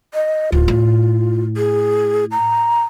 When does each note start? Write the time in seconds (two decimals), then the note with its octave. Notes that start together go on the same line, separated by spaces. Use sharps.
0.14 D#5
0.52 D1 F4
0.68 A2
1.57 G#4
2.31 A#5